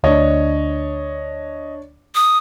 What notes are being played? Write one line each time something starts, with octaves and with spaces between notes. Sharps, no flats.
D2 D4 C#5 D#5
D#6